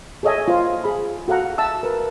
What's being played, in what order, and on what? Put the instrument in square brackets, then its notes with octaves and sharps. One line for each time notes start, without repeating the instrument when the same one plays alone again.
[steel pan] G#4 A4 C#5 D#5 E5 G#5
F4 C5
G#4 B5
F#4 A4 F5 F#5 A#5
E5 A5 E6
A#4 B4